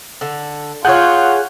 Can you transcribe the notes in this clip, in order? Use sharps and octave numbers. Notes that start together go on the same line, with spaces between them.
D3
F4 G#4 A4 C#5 F#5 F#6 G6